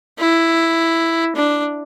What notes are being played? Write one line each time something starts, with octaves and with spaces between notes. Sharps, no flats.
E4
D4